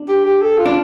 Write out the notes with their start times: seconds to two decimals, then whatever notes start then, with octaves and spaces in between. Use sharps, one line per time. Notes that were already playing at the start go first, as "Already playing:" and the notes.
Already playing: D4
0.08 G4
0.25 G4
0.42 A4
0.58 F4
0.66 D4